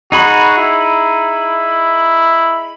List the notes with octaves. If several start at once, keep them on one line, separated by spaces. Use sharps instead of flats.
D#4 F#4 G#4 B5
E4